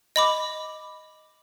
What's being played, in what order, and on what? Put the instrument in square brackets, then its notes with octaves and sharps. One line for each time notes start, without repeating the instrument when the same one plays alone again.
[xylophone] D#5 B5 D6